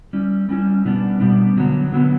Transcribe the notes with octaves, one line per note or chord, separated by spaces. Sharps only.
G3 C#4 E4
G3 C#4 E4
B2 G3 B3 D4
B2 G3 B3 D4
D3 F#3 B3
D3 F#3 B3